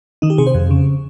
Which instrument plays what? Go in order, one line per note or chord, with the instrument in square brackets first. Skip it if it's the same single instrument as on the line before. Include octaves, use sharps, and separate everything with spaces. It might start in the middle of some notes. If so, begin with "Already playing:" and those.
[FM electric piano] D#3 D#4
G4
C3 G#4
C5
F2
C#3